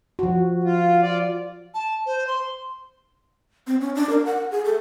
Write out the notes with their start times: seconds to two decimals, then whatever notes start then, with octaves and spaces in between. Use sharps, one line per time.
0.19 F3 F#4
0.64 F4
1.02 F4 D5
1.74 A5
2.06 C5
2.27 C6
3.67 C4
3.81 C#4
3.95 D4
4.10 A#4
4.25 F#5
4.51 G#4
4.65 A4